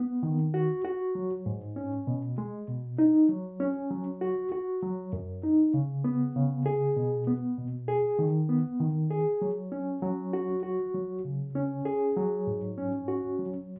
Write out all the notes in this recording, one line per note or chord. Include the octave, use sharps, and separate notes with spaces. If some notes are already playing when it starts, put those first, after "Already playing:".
Already playing: B3
D#3
F#4
F#4
F#3
G#2
C#4
B2
G#3
B2
D#4
F#3
C#4
F#3
F#4
F#4
F#3
F#2
D#4
C#3
B3
C#3
G#4
B2
B3
B2
G#4
D#3
B3
D#3
G#4
F#3
C#4
F#3
F#4
F#4
F#3
C#3
C#4
G#4
F#3
G#2
C#4
F#4
F#3